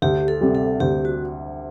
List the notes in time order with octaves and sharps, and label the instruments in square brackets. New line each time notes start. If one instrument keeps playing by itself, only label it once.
[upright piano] D2 [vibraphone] G4
[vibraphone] A4
[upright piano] C3 G3
[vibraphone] A4
[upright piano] D2 [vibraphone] G4
[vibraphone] F#4